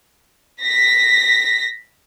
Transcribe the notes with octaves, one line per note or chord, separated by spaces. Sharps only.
A#6 B6